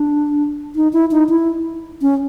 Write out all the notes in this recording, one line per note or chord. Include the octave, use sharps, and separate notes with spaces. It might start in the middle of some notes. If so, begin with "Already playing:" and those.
Already playing: D4
D#4
E4
D#4
E4
C#4